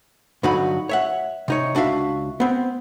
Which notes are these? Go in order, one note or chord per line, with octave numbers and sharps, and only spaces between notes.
G2 D3 F#3 D#4 F#4 B5
C#5 E5 F#5
C3 D#4 C#5
C#2 D4 F#4 E5 F5
B3 C4